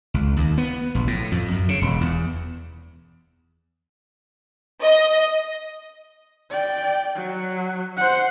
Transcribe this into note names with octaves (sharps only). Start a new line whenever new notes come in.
C#2
D#2
B3
A#1
A2
F2
F#2
C#3
E1
E2
D#5
D5 G5
F#3
C5 F#5